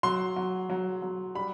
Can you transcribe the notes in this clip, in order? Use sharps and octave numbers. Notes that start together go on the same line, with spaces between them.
F#3 C6
F#3
F#3
F#3
G3 B5